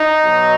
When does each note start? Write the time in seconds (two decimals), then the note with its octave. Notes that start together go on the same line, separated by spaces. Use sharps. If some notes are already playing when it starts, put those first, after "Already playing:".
Already playing: D#4
0.24 B2 F#3